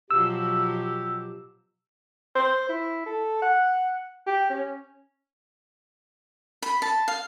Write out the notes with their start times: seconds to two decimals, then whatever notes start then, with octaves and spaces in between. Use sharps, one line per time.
0.11 B2 F3 F#3 G4 E6
2.35 C5
2.69 E4
3.06 A4
3.42 F#5
4.26 G4
4.50 C#4
6.62 B5
6.82 A5
7.08 F5